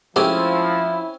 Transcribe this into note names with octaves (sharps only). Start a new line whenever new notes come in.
F3 G#3 A3 C4 C#4 E4 G4